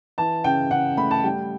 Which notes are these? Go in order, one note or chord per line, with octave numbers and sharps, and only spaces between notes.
E3 A5
C#3 G5
C#3 F#5
A3 B5
A5
G3 G5